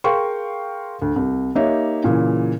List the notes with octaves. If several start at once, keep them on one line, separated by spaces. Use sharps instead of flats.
G#4 A#4 F5 G5 C6 C#6
D2
C2
A#3 D#4 G4 C#5 E5
A#2 C#3 E3